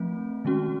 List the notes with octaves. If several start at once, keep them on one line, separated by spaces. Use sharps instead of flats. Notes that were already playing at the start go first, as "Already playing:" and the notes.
Already playing: F3 A3 C4
D#3 G#3 C#4 F#4